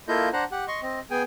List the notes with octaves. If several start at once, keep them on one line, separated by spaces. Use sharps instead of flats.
A#3 E4 F4 A4 D#5 G6
D4 C5 F#5 A#5
G4 F#5
D#5 C6 C#6
C4 D#5
B3 G#4 G5 G#5